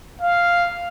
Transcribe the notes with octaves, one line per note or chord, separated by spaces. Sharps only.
F5